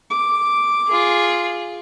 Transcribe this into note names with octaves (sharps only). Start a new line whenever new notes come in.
D6
F4 G#4